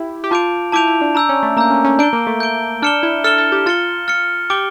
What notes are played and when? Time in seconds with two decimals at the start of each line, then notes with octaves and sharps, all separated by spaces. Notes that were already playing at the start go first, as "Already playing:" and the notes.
Already playing: E4 G4
0.24 G4
0.31 F4 A5 D6 G6 D7 F7
0.72 E4 A5 D6 G6 D7 F7
0.87 E4
1.01 D4
1.15 D4 A#5 E6 G6
1.29 C#4
1.43 A3
1.57 A#3 A#5 E6 G6
1.71 C#4
1.84 C#4
1.99 D4 G6 D7 G7
2.13 A#3
2.27 A3
2.40 G6 D7 G7
2.82 D4 F6 C#7 E7 G7
3.03 E4
3.24 A4 F6 C#7 E7 G7
3.38 A4
3.52 G4
3.66 F4 F6 A6 C#7 G7
4.08 F6 A6 C#7 G7
4.50 G4 D6 A6 D7 G7